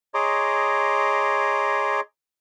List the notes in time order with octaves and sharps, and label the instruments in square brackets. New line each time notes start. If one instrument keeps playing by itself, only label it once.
[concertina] G#4 C#5 D#5 A#5 C6 D6